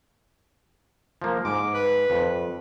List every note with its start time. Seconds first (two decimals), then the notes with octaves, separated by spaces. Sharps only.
1.22 F3 A#3
1.45 G#2 D6
1.74 B4
2.10 F2